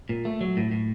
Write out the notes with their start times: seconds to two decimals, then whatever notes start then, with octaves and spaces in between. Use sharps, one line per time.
0.09 A#2
0.25 A3
0.41 F#3
0.57 A2
0.72 A2